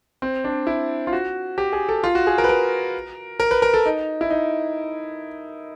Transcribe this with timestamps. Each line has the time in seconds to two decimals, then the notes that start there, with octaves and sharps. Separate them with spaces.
0.22 C4
0.44 D4
0.67 E4
1.07 F4
1.13 F#4
1.58 G4
1.73 G#4
1.89 A4
2.04 F4
2.15 F#4
2.27 G#4
2.38 A#4
2.44 B4
2.49 A#4
3.40 A#4
3.51 B4
3.62 A#4
3.74 A4
3.86 D#4
4.21 E4
4.30 D#4